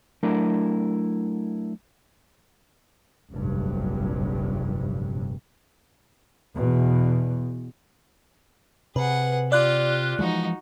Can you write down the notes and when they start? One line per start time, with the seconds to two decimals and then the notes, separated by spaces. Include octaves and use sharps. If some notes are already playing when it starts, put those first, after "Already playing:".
0.23 F#3 A3 D4 E4 A#4
3.32 F1 A#1 G2 F#3
6.56 E2 B2
8.96 C3 G#4 B4 F#5
9.52 F4 G4 D5 F#6
10.19 E3 F3 G#3 D#4 F#4